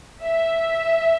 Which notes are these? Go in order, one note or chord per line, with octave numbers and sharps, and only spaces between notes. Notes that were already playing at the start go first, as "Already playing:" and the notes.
E5